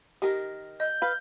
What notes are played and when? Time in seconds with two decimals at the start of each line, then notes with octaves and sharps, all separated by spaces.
0.22 D#3 G4 A#4
0.80 D#5 G6
1.02 B4 F5